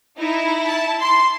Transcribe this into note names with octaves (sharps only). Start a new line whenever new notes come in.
D#4 E4
A5
C6